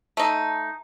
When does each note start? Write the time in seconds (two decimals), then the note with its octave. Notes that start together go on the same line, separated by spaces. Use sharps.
0.17 A3 D#4